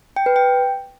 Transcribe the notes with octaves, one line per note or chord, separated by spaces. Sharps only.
G5
B4
G5